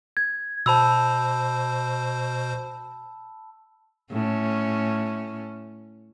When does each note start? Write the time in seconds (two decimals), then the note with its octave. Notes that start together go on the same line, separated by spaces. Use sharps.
0.17 G#6
0.66 B2 C5 A5 B5 E6
4.11 A2 C#4